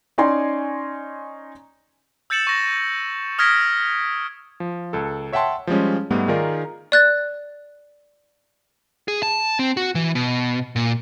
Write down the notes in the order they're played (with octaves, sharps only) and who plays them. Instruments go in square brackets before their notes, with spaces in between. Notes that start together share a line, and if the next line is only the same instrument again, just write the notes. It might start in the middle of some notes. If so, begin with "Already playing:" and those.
[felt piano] C#4 D#4 D5 G#5 C6
[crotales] E6 G6 A6 C#7 E7 F#7
C#6 A#6
D#6 F6 G#6 A#6 B6 D7
[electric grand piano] F3
C#2 A4
C#5 E5 F#5 G5 A5 C6
F3 G3 G#3 C#4
G#2 G3 A3 B3
D#3 D#4 F4 G#4 A#4 D5
[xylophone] D5 F#6 A6
[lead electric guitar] G#4
A5
C4
F#4
E3
B2
A#2